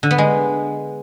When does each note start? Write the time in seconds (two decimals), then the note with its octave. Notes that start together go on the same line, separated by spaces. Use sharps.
0.03 D3
0.11 B3
0.18 G#3